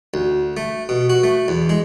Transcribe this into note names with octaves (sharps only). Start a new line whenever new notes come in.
D2
A3
B2
F#4
A3
E2
G#3